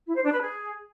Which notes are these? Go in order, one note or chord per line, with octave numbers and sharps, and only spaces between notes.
E4
C5
D4
B4
G#4